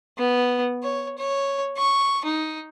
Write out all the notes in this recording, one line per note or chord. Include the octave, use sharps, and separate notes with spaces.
B3
C#5
C#5
C#6
D#4